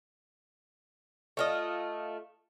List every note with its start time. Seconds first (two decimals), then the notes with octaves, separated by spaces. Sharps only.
1.37 A3 F4 D#5